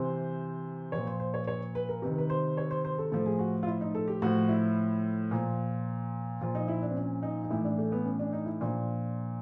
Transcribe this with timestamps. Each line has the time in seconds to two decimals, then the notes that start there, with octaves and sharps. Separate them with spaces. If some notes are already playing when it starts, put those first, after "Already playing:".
Already playing: C3 E3 C5
0.92 A#2 F3 C#5
1.07 C5
1.20 C5
1.34 C#5
1.48 C#5
1.75 B4
1.89 A#4
2.02 C3 D#3 B4
2.18 B4
2.30 C5
2.57 C#5
2.71 C5
2.85 C5
2.98 A4
3.12 A2 F3 A4
3.26 G#4
3.39 F#4
3.63 F4
3.67 E4
3.81 D#4
3.95 A4
4.08 G4
4.22 A2 F3 F#4
4.49 E4
5.31 A#2 F3
6.41 A#2 F3 F4
6.55 D#4
6.68 E4
6.82 D4
6.89 C4
6.95 C#4
7.23 D#4
7.44 D#4
7.50 A2 E3 E4
7.64 D4
7.78 A3
7.92 B3
8.05 C#4
8.19 D4
8.33 D#4
8.46 E4
8.61 A#2 F3 D4